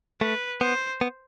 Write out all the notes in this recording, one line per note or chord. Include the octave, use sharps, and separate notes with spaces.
A3 B4
B3 C5
B3